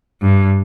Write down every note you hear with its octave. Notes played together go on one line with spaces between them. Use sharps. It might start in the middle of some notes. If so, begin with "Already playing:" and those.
G2